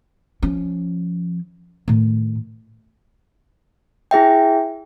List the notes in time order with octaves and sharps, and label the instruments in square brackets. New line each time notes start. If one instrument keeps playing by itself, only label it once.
[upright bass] F3 C#4
A2 D#3
[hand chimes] E4 G#4 E5 G5